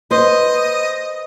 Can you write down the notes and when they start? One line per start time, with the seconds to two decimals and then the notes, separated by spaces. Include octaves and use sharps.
0.11 B4 C5 D#5